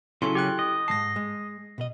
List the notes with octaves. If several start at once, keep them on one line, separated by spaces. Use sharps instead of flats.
C#3 F#3 C#4 E4 A4 C6
G4 G5 F#6
D#5
G#2 F3 A5 A#6 C7
G#3
B2 D#5